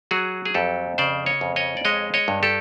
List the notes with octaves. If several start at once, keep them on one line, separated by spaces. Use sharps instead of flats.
F#3 F#4 G#4
G#4
F2 G4 A4
C#3 C5 D5
C#5 D#5
F2
C#5 D#5
D5
G#3 C#5 D#5
C#5 D#5
G2
G4 A4